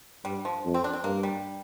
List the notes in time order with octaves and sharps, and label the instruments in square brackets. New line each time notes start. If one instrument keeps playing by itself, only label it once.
[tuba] G2 [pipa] G3
[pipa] F3
[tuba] F2
[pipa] C4
D4
C4
[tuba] G2 [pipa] A#3
[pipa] G3